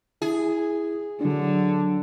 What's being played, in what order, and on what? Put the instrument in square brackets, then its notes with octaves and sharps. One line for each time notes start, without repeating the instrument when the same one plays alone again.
[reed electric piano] E4 [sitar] G#4
[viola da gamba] D3 [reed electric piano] F#3 D4